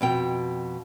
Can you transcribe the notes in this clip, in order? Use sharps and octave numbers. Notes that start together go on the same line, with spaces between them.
F2 B2 G5